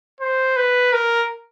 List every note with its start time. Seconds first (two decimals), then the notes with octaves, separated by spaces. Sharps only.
0.20 C5
0.57 B4
0.93 A#4